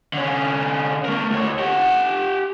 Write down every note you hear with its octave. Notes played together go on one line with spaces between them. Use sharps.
D3 C#4
A3 A#4
D2 C#5
G4 F#5